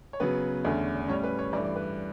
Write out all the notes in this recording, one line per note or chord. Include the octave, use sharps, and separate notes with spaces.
C#5
C#3 F#3 B3 B4
E2 D3 A3 C#4
A2 G3 C#4 C#5
B4
C#5
G2 E3 A3 D5
D5
B4